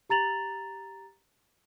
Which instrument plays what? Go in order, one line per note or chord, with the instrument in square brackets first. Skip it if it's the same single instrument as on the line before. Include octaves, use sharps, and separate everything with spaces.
[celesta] G4 A#5 A6 F7 F#7